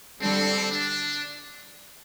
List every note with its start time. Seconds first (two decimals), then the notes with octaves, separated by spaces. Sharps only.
0.21 D3 G3 C4 D4 A4
0.70 D4